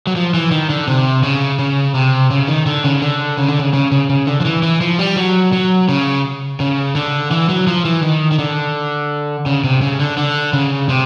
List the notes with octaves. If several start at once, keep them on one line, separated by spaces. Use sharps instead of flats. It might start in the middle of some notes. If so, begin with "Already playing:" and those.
F#3
F3
E3
D#3
D3
C3
C#3
C#3
C3
C#3
D#3
D3
C#3
D3
C#3
D3
C#3
C#3
C#3
C#3
D3
F3
E3
E3
F3
G3
F#3
F#3
C#3
C#3
D3
E3
F#3
F3
E3
D#3
D#3
D3
C#3
C3
C#3
D3
D3
C#3
C3